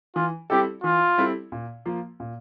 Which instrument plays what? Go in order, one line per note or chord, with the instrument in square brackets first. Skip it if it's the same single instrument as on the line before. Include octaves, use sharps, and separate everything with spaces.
[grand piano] E3 [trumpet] F4
[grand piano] G3 C4 E4 A4 [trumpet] G4
[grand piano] E3 [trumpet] F4
[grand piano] G3 C4 E4 A4
A#2
F3 A#3 F4
A#2